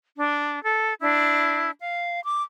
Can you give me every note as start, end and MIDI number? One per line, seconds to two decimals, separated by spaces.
0.18 0.61 62
0.62 0.94 69
1.00 1.69 62
1.00 1.69 64
1.79 2.19 77
2.23 2.41 86